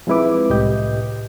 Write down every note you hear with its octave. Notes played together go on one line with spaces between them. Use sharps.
F3 G#3 C4 E4 B4 D6
C2 A2 G4 D#5 G6